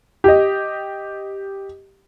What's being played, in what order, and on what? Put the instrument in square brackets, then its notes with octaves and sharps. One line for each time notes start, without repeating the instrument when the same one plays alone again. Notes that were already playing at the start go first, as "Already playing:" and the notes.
[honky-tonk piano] G4 D#5